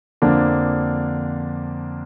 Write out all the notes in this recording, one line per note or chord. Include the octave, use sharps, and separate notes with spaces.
F2 D3 F3 A#3 D4